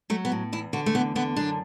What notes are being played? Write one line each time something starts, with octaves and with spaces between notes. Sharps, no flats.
F#3 A3
B3
A2
E2 E4
D3 F#4
A3
E2 B3
D3 B3
F#2 D4